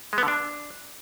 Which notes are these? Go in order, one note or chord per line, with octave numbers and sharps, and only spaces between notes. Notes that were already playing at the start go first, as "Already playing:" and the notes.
G#3
B3
D3
D4